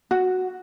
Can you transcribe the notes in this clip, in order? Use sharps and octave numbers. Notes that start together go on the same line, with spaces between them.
F#4